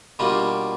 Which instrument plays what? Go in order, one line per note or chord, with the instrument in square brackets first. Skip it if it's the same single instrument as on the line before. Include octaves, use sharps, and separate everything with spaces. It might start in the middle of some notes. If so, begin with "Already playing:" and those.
[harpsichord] B2 G3 A#3 D4 F4